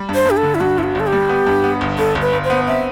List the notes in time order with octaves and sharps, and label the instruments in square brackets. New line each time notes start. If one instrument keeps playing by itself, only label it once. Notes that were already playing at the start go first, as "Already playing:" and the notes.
Already playing: [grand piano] G3
G2
[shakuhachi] C5
[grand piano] G2 [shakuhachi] G4
[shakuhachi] A4
[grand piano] D3
[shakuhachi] E4
[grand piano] G2 [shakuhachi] F#4
[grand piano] G1 [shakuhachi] E4
[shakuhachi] F#4
[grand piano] G1 [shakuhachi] A4
[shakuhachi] G4
[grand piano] G3
B3
G2
B3
G1
[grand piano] G1 [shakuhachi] A4
[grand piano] G1
[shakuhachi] B4
[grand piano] G1
[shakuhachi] C5
[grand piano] B3
[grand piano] C4 [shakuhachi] E5